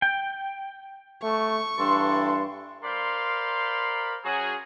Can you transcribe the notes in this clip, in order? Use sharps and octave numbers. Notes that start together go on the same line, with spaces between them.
G5
A3 C#6
G2 E3 D4 A4 C6
A#4 C5 D5 F5 B5 C6
F#3 C#4 F#4 G#4